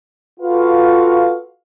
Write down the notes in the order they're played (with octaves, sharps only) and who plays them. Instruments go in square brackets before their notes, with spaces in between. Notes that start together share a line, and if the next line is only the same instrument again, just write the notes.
[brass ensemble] F4 F#4 A4 B4 F5